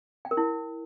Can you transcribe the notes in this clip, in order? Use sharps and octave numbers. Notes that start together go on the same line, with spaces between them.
G5
A#4
E4